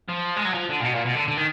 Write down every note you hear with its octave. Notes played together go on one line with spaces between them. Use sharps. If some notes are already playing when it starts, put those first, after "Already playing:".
F3
G#3
F#3
F3
D3
A#2
B2
A#2
B2
D3
D3
D#3